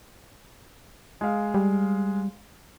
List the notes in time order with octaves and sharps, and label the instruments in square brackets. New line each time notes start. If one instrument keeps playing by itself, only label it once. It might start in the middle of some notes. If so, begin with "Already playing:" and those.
[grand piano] G#3 F5
[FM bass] G3